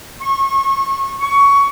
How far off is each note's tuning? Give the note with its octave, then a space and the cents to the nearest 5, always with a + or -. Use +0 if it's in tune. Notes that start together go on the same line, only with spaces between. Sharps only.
C#6 -35
C#6 +15